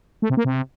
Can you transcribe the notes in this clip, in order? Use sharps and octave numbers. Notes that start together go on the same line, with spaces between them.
A3
C3
A#3
C3